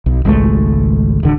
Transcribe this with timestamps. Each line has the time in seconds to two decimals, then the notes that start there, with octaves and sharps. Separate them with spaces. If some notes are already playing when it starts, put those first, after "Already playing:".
0.06 B1
0.25 G#1 C#2 G#3 A3
1.23 D1 D3